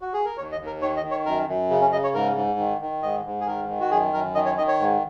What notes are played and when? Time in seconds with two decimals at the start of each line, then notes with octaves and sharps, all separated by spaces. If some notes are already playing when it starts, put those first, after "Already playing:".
0.01 F#4
0.13 G#4
0.25 A#4
0.38 D#2 C#5
0.52 D#5
0.60 D#2
0.67 A#4
0.81 D#3 C#5
0.97 D#5
1.04 D#3
1.11 C#5
1.25 F#2 A#4
1.48 F#2
1.70 C#3
1.81 C#4
1.92 C#3 D#5
2.04 C#5
2.14 G#2 A#4
2.36 G#2
2.59 D#3
2.81 D#3
3.02 G#2 D#5
3.25 G#2
3.41 G#4
3.47 D#3 A#4
3.69 D#3
3.80 F#4
3.91 F#2 G#4
4.13 F#2 A#4
4.35 D#3 D#5
4.46 C#5
4.58 D#3 D#5
4.68 C#5
4.80 G#2